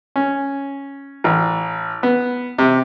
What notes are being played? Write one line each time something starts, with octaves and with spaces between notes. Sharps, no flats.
C#4
A1
B3
C3